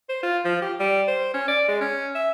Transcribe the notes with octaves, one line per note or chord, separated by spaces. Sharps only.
C5
F4
F3
G4
G3
C5
C#4
D5
G#3
C#4
E5